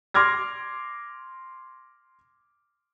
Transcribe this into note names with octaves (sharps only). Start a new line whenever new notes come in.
C6 D6 F6 G#6 A#6